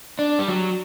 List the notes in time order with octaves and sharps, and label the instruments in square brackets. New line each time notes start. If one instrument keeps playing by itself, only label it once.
[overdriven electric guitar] D4
G3
F#3